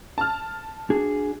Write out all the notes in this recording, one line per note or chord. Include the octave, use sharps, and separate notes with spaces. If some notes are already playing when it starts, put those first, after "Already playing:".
A5 F6
D4 F#4 G#4